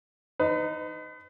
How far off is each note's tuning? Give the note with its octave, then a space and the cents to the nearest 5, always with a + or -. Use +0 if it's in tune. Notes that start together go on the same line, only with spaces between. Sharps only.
D#4 -10 B4 +40